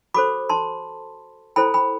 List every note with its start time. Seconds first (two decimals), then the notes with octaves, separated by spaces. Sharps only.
0.14 F#4 A4 C5 B5 D6
0.49 A5 C6
1.56 E4 A4 C5 G5 B5
1.74 G5 B5